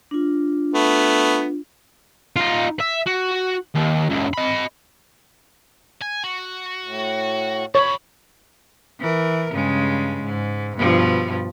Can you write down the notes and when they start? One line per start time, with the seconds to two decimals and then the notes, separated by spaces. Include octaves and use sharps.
0.11 D4 F4
0.74 A3 B3
2.36 D#4 F4
2.80 E5
3.06 F#4
3.75 D#2
4.10 C#2 F#2
4.34 D#5 B5
6.02 G#5
6.24 F#4
6.84 A2
7.75 D3 C#5 B5
9.00 E3 A#4
9.53 G2 C#3 G#3
10.23 G#2
10.77 G2 B2 F3